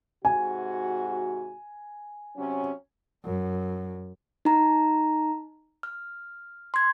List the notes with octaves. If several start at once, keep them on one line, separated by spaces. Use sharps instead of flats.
G#2 C3 F#4 G#5
C3 F#3 C#4
F#2
D#4 A#5
F6
C6 G#6